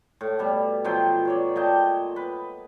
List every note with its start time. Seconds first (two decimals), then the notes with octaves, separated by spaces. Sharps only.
0.21 A2
0.39 B2 G3
0.84 B2 F3 F#3 G5
1.25 F#4 C#5 D5
1.56 A#2 D#5 G5 A5
2.16 B4